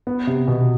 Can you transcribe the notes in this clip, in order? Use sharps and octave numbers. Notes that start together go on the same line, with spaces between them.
B3
C3
B2